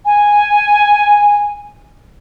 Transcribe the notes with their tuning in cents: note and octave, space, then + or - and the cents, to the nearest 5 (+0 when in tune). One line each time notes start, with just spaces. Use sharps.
G#5 -5